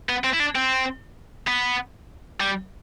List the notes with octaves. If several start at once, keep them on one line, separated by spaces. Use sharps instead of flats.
B3
C4
E4
D4
C4
B3
G3